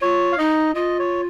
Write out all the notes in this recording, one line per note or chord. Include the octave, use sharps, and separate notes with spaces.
F4 C#5
F5
D#4 D#5
F4 D#5
C#5